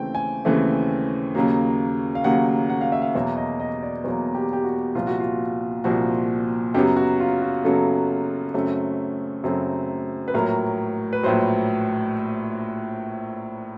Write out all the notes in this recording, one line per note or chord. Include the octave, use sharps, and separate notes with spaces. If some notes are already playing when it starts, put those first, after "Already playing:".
Already playing: D#2 C#3 E3 A3 C4 G5
G#5
D#2 C#3 E3 A3 C4
D#2 C#3 F#3 A#3
F5
D#2 C#3 F#3 A#3 F#5
F#5
F5
E5
F5
E2 B2 F#3 A#3 E5
D#5
D#5
D5
E2 B2 F#3 A#3
G4
G4
F#4
C2 A#2 F3 F4
F#4
F4
C2 A#2 F3 F#4
F#2 C#3 F#3 B3 G4
F#4
F4
F#4
F#2 C#3 F#3 B3 A4
F#2 C#3 F#3 A3 C4
F#2 C#3 F#3 A3 C4
B4
A#1 A2 F#3 A#4
B4
A#1 A2 F#3 C5